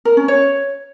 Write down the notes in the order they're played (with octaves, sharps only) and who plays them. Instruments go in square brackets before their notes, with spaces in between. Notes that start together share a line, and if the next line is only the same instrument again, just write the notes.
[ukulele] A#4
C#4
C#5